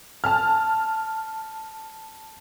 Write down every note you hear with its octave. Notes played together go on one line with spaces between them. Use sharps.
A5 F6